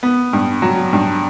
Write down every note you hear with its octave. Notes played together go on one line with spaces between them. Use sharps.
B3
G2
F#3
G2